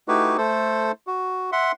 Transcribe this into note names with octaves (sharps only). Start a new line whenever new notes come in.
A3 D#4 E4 F#4 G4 B4
A3 A4 C5
F#4
E5 F#5 C6